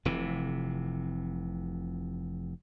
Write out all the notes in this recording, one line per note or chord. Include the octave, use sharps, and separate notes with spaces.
F1 C3 E3